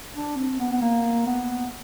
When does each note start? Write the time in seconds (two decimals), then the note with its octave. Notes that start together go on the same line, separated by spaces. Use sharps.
0.15 D4
0.36 C4
0.60 B3
0.72 B3
0.82 A#3
1.27 B3